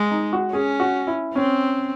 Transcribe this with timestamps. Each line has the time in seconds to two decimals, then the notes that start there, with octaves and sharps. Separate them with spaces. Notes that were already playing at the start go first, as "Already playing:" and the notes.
Already playing: G#3
0.11 D#4
0.33 F#4
0.53 C#4 G#4
0.80 F#4
1.07 E4
1.34 C4 C#4